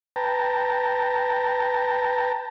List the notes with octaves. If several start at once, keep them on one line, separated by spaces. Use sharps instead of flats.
B4 G5 A5 A#5